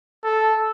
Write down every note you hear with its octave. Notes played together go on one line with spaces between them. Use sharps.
A4